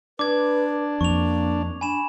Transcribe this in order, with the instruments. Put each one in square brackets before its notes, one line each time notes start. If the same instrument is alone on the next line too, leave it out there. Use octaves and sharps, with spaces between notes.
[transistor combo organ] D4 [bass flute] B4 [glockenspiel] D6 G#6
[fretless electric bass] F2 [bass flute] A#3 [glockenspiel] C#6 F7
[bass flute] D4 [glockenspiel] G#5 B5 E7